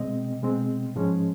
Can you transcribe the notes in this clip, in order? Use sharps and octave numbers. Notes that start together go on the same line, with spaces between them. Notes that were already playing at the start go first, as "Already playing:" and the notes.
Already playing: B2 G#3 C4 D#5
B2 G#3 C4
G#2 F3 G#3 C#4